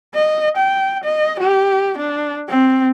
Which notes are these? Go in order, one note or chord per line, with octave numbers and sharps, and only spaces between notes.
D#5
G5
D#5
G4
D4
C4